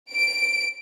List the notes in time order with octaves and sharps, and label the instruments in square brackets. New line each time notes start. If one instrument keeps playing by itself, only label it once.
[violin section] D7